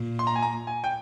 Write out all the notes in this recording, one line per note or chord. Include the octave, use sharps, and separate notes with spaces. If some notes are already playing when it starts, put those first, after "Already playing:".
Already playing: A#2
C6
A#5
G#5
A#5
G#5
G5